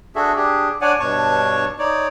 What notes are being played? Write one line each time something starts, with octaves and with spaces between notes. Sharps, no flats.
D4 F#4 G#4 A4 E5
D4 G4 G#4
D4 C#5 D5 F#5 G#5
G2 B2 D4 C#5 A5 C#6
D#4 C#5 D5